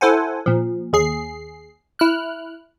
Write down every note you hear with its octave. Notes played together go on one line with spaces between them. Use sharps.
E4 A4 C5 F#5 G#5
A#2 F3
D#2 G#4 C7
E4 F6 F#6